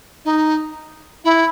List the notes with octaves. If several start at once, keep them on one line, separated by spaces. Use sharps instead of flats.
D#4
E4